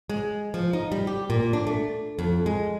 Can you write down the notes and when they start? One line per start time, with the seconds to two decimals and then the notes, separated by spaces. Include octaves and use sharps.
0.10 G#3
0.54 F3
0.73 D#4
0.92 G3
1.07 G4
1.30 A#2
1.53 D4
1.67 A3
2.19 F2
2.46 G#3